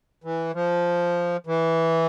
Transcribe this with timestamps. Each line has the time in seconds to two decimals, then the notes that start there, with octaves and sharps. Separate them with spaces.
0.24 E3
0.54 F3
1.47 E3